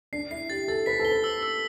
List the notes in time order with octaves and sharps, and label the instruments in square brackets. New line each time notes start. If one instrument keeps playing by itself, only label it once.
[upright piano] D4 [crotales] C7
[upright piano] E4 [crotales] C7
[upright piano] G4 [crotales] A6
[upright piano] A4 [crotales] A6
[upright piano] B4 [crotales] B6
[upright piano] A4
[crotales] G7
[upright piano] B4
[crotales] E6
E6